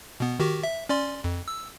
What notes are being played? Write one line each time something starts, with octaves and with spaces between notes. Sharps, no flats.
B2 B3
D#3 F#4 G4
E5
C#4 D5 C6
F2
E6